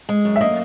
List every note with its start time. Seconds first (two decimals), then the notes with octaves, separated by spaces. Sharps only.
0.09 G#3
0.25 F#2
0.36 E5
0.41 A#3 D#5